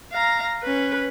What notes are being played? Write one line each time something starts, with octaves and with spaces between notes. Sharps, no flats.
F5 A#5
C#4 B4